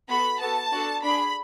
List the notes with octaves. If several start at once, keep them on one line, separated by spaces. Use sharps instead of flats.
B3 F#4 A4 B5
B3 F#4 A4 A5
D4 F#4 A4
D4 B5
G#4